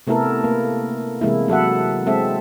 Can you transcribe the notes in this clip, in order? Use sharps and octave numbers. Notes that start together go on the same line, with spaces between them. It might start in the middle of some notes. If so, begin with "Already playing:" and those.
C3 A3 B3 E4 A4 A#4
A#3
C3 E3 G#3 A#3 E4
F#3 A4 E5 F#5
G#3 C4 A4 E5